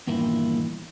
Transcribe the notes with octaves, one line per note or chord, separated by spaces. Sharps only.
E2 G2 A#2 D#3 A#3 E4